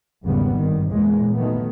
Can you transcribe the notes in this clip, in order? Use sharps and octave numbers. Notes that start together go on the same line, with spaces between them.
G#1 E2 C#3 G3 B3
G2 D#3
E2 A#2 G#3
D#3 F#3 A3 B3